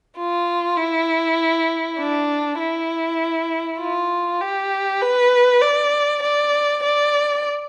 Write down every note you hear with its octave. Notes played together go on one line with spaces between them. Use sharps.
F4
E4
D4
E4
F4
G4
B4
D5
D5
D5